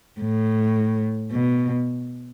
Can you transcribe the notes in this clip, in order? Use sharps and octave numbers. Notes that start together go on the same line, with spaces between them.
A2
B2